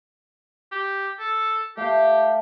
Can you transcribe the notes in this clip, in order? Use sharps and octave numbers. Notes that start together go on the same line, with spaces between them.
G4
A4
A3 G4 F5 A5